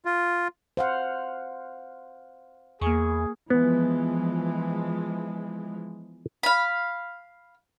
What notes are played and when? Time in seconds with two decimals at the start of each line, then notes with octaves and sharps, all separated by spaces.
0.05 F4
0.77 C5 F5 F#5
2.81 E2 A#3 G#4 C#6
3.50 E3 F3 G#3 B3
6.43 F5 B5